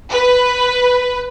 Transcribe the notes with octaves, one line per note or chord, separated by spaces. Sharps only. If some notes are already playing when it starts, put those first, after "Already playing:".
B4